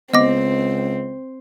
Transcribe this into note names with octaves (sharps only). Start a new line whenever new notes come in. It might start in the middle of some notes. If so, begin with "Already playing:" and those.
C#2 B3 C4 D#5 D6 A#6